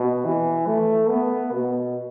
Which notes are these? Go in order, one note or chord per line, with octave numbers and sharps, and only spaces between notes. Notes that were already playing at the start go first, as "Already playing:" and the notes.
Already playing: B2
E3
A3
B3
B2